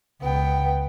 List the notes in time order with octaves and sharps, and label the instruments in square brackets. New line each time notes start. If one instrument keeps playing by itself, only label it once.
[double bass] C#2 [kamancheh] B3 G5